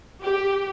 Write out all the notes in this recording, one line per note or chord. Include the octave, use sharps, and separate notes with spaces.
G4